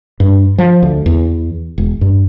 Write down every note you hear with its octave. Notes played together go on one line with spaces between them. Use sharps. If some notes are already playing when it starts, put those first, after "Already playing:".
G2
F3
D2
E2
E1
G2